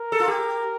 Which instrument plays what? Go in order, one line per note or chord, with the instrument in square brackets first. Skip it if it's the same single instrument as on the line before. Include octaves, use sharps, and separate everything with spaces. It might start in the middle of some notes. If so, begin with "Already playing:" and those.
Already playing: [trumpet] A#4
[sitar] A4
F4
G4